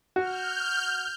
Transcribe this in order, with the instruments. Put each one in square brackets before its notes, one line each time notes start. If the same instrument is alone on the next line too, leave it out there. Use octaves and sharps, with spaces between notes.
[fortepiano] F#4 [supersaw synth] F6 G6